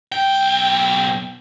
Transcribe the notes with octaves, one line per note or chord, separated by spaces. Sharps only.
B1 G5